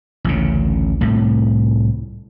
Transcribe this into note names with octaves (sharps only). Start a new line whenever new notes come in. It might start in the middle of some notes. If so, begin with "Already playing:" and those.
A1 D2 C#3
C2 A2 A3